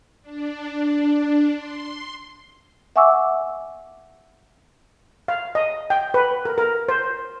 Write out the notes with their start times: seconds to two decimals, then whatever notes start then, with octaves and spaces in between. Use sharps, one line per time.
0.22 D4
1.54 C6
2.96 E5 F#5 G#5 C#6 D6 E6
5.28 F5
5.55 D#5
5.90 G5
6.14 B4
6.45 A#4
6.58 A#4
6.89 C5